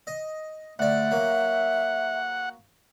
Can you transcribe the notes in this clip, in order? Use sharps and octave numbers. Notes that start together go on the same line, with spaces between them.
D#5
D2 D5 E5 F#5
F#3 A#3